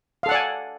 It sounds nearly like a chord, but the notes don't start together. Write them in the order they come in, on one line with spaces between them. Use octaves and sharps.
F5 A4 F#5 D5 G#5